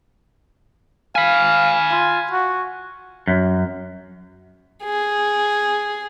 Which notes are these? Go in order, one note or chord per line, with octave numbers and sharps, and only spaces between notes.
F5 G#5 B5
F4
F#4
F#2
G#4